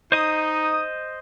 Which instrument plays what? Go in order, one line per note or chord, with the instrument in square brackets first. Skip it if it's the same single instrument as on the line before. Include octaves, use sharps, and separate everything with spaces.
[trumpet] D#4 [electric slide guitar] C5 D#5 [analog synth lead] D#6